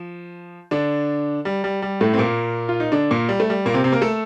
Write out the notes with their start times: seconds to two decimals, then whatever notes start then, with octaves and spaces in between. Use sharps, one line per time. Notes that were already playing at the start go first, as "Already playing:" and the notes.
Already playing: F3
0.71 D3 D4
1.45 G3
1.64 G3
1.82 G3
2.01 A2 A3
2.14 C4
2.18 A#2 A#3
2.69 F4
2.80 D#4
2.92 D3 D4
3.11 A#2 A#3
3.29 G3
3.40 A3
3.50 G3
3.65 A#2 A#3
3.74 C3 C4
3.84 C3 C4
3.92 A#3 A#4
4.02 A3 A4